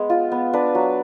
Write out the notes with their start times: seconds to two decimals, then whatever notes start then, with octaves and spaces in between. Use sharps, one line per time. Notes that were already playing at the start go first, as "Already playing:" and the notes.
Already playing: G#3 B3
0.10 F4
0.32 B3
0.53 D4 B4
0.75 F#3